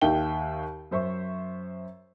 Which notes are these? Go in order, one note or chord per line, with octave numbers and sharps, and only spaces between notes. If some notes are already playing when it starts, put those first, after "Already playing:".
D#2 D#3 E5 F5 G5 G7
F#2 C5 E5 C#6